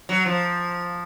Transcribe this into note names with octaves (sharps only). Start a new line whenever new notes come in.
F#3
F3